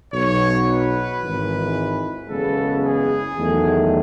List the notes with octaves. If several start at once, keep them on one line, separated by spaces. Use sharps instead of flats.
B1 B2 F#3 C#5
B4
G#1 G#2 E3
F#1 E2 C#3 G#3 B3 A4
G#4
E2 D#3 F#3 A3